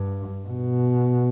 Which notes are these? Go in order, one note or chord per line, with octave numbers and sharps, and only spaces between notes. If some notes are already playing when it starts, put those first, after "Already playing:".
Already playing: G2
B2